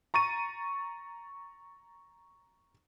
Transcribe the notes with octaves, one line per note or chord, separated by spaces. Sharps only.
A#5 C#6 A6 D#7